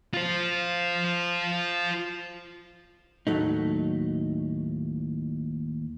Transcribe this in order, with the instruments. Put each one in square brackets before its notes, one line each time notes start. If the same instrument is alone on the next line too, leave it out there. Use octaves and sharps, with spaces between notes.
[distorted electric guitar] F4 C5
[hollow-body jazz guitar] D#2 A2 C#3 F#3 A3 D#4